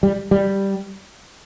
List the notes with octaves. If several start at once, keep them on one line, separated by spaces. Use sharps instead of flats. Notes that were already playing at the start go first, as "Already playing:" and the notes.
G3
G3